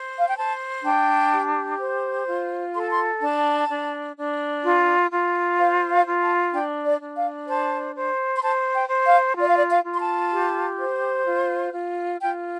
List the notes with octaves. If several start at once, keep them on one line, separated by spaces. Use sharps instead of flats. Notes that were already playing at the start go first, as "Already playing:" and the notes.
Already playing: C5
F5
G5
C5 A5
D4 G5
G4
C5
F4
A4 C6
A5
C6
D4 A5
D4
D4
F4
F4
C5 F5
F5
F4
A5
D4 G5
D5
D4
F5
C5 A5
C5
C6
C5 A5
G5
C5
F5
F4 D5
F5
D5
F5
F4
C6
A5
G4
C5
F4
F4
F4 G5